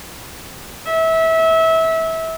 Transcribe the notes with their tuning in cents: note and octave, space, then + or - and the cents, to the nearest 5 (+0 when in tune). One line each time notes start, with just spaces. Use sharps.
E5 -25